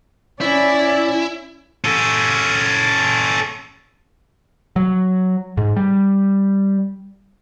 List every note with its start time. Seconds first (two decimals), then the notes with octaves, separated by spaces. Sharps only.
0.41 C#4 E4 D5
1.84 C#4 A4
4.76 F#3
5.57 G#2
5.76 G3